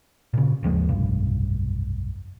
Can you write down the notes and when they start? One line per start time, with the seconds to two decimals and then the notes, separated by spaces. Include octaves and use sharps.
0.33 A#2 C#3
0.63 G#1 D#2 F3 G#3
0.89 F1 B1 G2